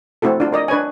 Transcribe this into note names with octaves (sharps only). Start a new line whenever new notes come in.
A3 C4 E4 F#4 A4
D4 F4
A#4 D5 D#5
D4 B4 C#5 G#5